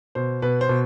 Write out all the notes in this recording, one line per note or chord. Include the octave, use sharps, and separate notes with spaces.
B2 C5
B2 B4
C5
B2